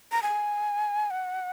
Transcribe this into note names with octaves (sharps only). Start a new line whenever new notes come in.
A#5
G#5
F#5